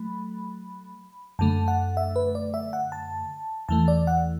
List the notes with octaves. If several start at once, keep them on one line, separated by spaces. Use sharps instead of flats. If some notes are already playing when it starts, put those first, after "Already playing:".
Already playing: F#3 A3 B5
F#2 D3 A3 A5
F#5
E5
B4
D5
E5
F#5
A5
E2 E3 A3 A5
D5
F#5